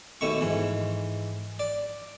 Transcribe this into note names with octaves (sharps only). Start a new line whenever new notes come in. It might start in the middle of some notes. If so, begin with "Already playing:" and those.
D#2 B2 A3 C#6
G#2 E3
D5